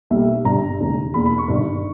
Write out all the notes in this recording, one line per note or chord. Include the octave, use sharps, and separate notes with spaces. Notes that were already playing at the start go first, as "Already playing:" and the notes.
B1 B2 G3 A#3 E5
G1 G2 G3 A#5
E1 D#2 C#3 G#3
E1 E2 D#3 A#3 B5
B5
C#6
G1 G2 D#3